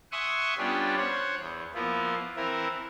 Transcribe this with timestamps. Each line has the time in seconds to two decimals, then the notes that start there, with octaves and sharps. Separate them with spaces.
0.12 E5 F#5 G#5 C6 C#6 D#6
0.58 G3 B3 C#4 D4 F4 G4
0.97 C5 C#5 F#5
1.39 E2
1.75 F3 A#3 B3 E4 F4
2.36 E3 C4 E4 A#4